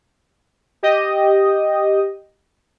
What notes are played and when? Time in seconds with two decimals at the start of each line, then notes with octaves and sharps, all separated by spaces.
0.83 G4 D#5